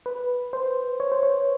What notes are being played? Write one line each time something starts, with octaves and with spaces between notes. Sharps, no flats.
B4
C5
C#5
C5
C#5